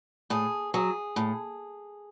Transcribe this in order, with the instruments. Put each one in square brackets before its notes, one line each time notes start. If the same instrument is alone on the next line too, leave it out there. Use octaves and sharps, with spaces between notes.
[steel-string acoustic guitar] A2 G#4
F#3 G#4
A2